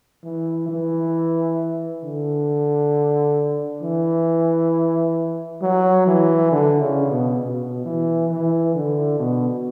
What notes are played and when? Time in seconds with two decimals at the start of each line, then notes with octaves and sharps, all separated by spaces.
0.24 E3
0.69 E3
2.04 D3
3.82 E3
5.62 F#3
6.07 E3
6.52 D3
6.82 C#3
7.11 B2
7.41 B2
7.86 E3
8.31 E3
8.75 D3
9.19 B2